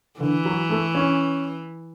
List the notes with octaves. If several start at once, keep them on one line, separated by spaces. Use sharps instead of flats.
D3 E3
F#3
A3
C#4